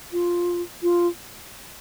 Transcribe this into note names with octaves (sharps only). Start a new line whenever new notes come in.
F4
F4